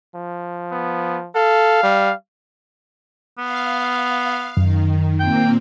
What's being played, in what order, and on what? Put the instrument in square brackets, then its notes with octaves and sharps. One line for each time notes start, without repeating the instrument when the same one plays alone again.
[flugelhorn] F3
[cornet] B3
[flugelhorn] A4 [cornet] F5
[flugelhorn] G3
[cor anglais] B3 [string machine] F5
[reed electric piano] F#2 [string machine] D#3
[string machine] A#2 A#3 C4 [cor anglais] G5